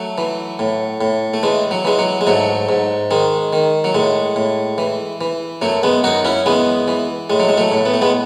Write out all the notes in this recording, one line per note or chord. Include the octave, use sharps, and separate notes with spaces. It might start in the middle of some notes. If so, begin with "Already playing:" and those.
Already playing: F#3 A3
E3
A2
A2
A3
E3 G#3
F#3
E3 G#3
F#3
G#3
G#2 F#3 A3
G#2
D#3 G#3
D#3
F#3
A2 G#3
A2
E3
E3
F#2 F#3 A3
G#3 B3
F#2 D#4 F#4
C#4 E4
E3 G#3 B3
E3
A2 G#3
F#3
G#3
F#3 A3
A2
B3
A3
G#3 B3